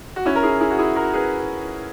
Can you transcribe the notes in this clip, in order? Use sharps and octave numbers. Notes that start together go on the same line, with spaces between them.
F#4
C#4 E4
A#4
E4 G#4
E4 G#4
F#4
E4 G#4
F#4 A#4
G#4 B4